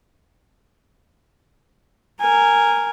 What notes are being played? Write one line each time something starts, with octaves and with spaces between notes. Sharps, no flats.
A#4 G#5